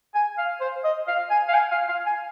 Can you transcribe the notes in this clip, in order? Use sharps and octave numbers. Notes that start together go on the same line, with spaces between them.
G#5
F5
C5
D#5
F5
G#5
F5
G#5
F5
F5
G#5